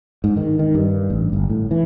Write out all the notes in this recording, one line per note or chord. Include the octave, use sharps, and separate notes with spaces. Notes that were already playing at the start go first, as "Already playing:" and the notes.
G#2
D#3
D#3
G2
A1
G1
A2
E3